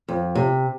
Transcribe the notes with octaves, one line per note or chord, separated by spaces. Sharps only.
F2
C3